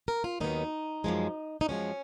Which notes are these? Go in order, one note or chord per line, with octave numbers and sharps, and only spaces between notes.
A#4
F4
D#2 D#3 F#3 B3 D#4
F#2 F3 G#3
D#4
F#2 F3 G#3 C#4